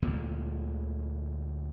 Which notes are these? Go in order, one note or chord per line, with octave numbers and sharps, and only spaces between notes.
D2 A#2 D3 G#3